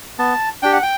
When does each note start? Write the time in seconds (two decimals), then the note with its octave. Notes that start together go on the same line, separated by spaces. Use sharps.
0.19 B3 A5
0.63 D4 G4 G5
0.73 F#5
0.83 G5